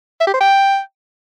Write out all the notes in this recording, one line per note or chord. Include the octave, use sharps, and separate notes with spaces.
E5
G4
C5
G5